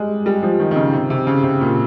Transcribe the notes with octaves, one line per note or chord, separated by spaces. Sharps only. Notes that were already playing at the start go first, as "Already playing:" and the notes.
Already playing: G3 G#3
G3
F3
D#3
D#3
C#3
C3
C3
C#3
C3
A#2